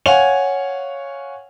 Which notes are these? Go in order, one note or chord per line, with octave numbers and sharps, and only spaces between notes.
C#5 F5 F#5 G#5 F7